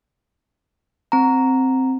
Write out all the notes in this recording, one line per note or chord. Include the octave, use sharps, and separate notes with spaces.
C4 A#5